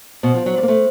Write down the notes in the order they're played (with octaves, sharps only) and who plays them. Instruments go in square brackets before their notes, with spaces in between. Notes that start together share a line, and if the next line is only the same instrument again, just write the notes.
[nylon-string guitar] B2 [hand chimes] C5
[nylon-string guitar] F3
[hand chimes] C5
[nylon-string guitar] F#3
[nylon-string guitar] G3 [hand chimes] C5
[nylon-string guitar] A#3
[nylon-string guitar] A3 [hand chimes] C5